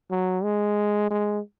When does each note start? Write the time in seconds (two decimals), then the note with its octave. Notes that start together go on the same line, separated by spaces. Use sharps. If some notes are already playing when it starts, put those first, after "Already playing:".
0.11 F#3
0.44 G#3
1.11 G#3